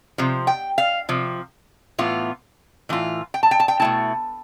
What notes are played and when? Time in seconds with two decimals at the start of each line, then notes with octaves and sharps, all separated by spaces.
0.18 C3 F3
0.47 G5
0.78 F5
1.09 C3 F3
1.98 A2 E3 B3 F4
2.89 A2 E3 F4
3.34 G5
3.43 A5
3.51 G5
3.60 A5
3.68 G5
3.80 B2 A3 E4 A5